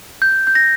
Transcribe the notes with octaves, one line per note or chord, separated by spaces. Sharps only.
G6
G6
A#6